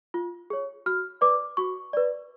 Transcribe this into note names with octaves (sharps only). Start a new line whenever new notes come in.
F4
G#4 C#5
F#4 F6
B4 D5 D6
F#4 C#6
B4 D5